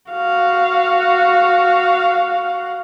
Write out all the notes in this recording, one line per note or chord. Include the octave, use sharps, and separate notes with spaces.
F#4 F5